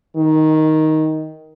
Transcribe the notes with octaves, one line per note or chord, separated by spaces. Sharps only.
D#3